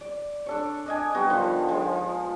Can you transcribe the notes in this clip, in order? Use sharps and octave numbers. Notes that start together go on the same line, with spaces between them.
D5
D4 A4 C#5
D4 D#5 G#5
G3 B3 F#4 G4
D3 D#3 F3
F3 G#3